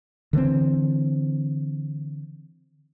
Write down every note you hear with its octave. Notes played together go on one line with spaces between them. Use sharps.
D3 E3 G#3 C4